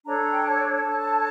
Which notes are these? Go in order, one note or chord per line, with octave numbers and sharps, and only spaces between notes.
D4 A4 C#5 A#5
G5
A5
D4 A4 C#5